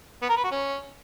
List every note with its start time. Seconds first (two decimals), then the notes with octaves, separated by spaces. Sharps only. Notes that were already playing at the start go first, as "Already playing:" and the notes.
0.22 B3
0.29 A#4
0.37 B4
0.44 F#4
0.51 C#4